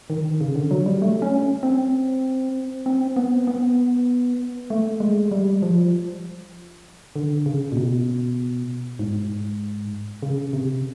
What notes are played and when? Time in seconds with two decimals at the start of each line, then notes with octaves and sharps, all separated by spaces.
0.10 D#3
0.41 C#3
0.56 D3
0.71 F#3
0.86 G3
1.02 A3
1.22 C#4
1.63 C4
2.86 C4
3.16 B3
3.47 B3
4.70 A3
5.00 G#3
5.31 G3
5.62 F3
7.16 D3
7.46 C#3
7.72 A#2
7.77 B2
8.99 G#2
10.23 C#3
10.53 C3